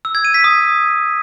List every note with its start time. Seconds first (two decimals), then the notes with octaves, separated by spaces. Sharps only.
0.05 E6
0.15 G#6
0.25 D#7
0.34 B6
0.44 D#6